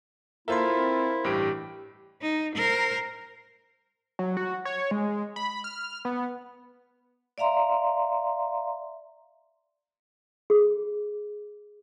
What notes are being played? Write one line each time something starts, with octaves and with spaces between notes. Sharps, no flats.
A#3 E4 F4 A4 A#4 C5 E5 C6
C4
A1 G2 G4 D7
D#4
A#4 C5
F#3
F#4
C#5
G#3
B5
F6
B3
D5 E5 F5 A#5 C6
G#4